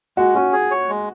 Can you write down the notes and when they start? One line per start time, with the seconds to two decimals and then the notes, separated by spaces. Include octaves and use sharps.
0.17 G#3 F#4
0.35 C#4 F#4
0.53 G#4
0.71 C#5
0.89 G#3